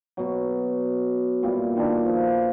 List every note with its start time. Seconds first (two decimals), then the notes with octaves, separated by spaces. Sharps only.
0.17 B2 F#3
1.43 A#2 G3 E4 F4
1.76 D#3 G3 D4
2.05 F3